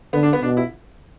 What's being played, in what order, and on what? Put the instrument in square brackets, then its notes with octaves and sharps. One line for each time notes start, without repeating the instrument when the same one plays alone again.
[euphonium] D3 [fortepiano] B3
[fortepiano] D4
B3
[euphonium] B2 [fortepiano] D4
[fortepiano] E4